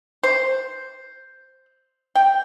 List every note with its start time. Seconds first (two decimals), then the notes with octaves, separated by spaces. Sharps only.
0.23 C5
2.15 G5